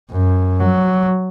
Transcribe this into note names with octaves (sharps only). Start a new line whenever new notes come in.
F#2
F#3